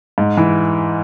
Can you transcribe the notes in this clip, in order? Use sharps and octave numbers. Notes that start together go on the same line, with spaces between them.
G#2
E3